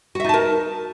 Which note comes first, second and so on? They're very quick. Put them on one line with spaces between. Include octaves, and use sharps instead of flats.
F#4 E5 D#4 A5 A#4